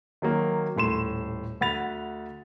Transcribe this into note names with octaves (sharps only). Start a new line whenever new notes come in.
D#3 F#3 A#3
D#1 A2 C6 E7
D2 F#5 B5 A6 F7